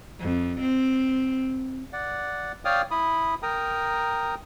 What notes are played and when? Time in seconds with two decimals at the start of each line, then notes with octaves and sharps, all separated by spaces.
0.20 F2
0.61 C4
1.93 D5 F#5
2.65 C#5 D5 F5 G5 D#6 F6
2.91 E4 B5 D#6
3.43 A#4 G5 A#5 D#6